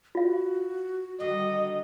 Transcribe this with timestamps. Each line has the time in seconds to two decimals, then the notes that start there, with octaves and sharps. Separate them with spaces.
0.15 F4 F#4 F5
1.20 G2 D3 D#3 D#5